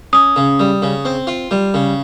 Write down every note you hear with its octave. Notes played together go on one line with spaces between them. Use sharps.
C#4 D#6
C#3
G3
C#3
C4
F4
G3
C#3